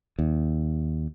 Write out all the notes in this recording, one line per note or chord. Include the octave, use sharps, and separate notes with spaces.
D#2